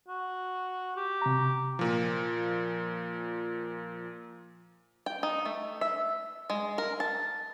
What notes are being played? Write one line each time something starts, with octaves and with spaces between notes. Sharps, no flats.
F#4
G4
C3 A#5
A#2 F3
G5
D#4
A3
E5
G#3
A#4
A5